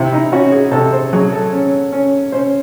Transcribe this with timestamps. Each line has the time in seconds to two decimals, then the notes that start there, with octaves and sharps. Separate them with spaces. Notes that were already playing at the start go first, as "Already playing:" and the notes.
Already playing: C3 E4
0.13 D#4
0.32 C#4 F#4
0.52 G#4
0.72 C3 A4
0.92 C5
1.13 F#3 G#4
1.32 A4
1.53 C#4
1.92 C#4
2.32 C#4 C5